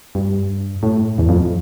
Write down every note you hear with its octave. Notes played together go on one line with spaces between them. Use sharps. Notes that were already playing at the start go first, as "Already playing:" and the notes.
G2
A2
E2
F2